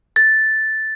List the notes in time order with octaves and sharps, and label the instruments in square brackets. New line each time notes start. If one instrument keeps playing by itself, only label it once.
[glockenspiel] A6